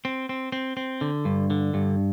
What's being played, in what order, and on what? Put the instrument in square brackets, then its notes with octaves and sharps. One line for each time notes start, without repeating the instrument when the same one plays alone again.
[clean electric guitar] C4
C4
C4
C4
D3
G2
D3
G2